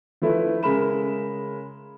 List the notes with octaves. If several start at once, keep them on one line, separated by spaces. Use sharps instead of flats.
F3 A3 E4 B4
C#3 G#3 A#4 B5 E7